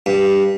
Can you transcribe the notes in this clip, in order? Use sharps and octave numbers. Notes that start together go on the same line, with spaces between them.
G2